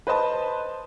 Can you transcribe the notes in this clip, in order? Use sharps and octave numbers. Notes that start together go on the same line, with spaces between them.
B4 C5 D#5 A5